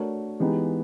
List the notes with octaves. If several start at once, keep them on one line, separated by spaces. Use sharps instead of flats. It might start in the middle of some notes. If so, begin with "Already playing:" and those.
Already playing: A3 D4 F#4 A#4 C#5
E3 G#3 B3 D#4 G4